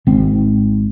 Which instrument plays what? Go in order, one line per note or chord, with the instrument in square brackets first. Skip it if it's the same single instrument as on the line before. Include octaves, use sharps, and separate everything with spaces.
[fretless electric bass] G#1 C4